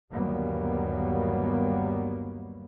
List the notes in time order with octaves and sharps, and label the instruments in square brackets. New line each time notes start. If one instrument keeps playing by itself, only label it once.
[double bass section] G1 D#2 F#3 G3 A#3 B3